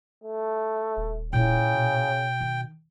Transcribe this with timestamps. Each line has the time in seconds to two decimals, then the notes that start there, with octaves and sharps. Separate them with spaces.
0.24 A3
0.97 D#1
1.33 A#2 C#3 E4 G5
1.74 B2
2.41 D#3